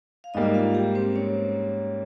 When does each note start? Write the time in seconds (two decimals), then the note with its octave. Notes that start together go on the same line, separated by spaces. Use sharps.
0.24 F5
0.34 G#2 G3 A#3 D#4 D#5
0.54 F4 F5
0.74 G4 G5
0.95 C4 C5
1.16 C#4 C#5